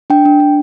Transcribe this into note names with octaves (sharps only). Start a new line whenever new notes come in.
D4 G5
D4
D4